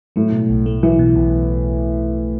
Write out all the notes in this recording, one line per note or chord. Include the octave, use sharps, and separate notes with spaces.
A2 F#3
B2
B1
A3
E3 F#3
B2
B1